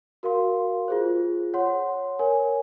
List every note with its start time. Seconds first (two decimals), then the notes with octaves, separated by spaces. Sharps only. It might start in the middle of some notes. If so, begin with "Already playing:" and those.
0.23 F#4 A#4 F5 C6
0.88 F4 G#4 C5
1.54 C#5 F#5 C6
2.19 A#4 C#5 G#5